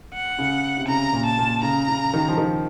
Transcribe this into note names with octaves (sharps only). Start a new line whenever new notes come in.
F#5
C#3
C3
C#3 A#5
A#2
A5
A#2
C#3 A#5
C#3
D#3
F3
D#3